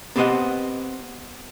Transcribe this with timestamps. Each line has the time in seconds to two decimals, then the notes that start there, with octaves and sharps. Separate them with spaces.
0.16 B3 C4 G4 C5 D#5 F#5